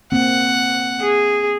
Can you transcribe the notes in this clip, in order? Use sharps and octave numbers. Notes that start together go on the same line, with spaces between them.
A#3 C4 F#5
G#4